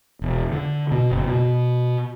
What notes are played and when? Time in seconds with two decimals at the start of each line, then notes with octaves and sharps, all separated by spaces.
0.22 E1
0.52 D3
0.92 B2
1.11 F#1
1.27 B2